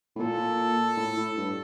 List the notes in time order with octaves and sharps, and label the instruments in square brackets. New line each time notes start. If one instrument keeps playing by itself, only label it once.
[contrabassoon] A2
[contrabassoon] A#2 [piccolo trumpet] A4
[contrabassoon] A2
A2
G2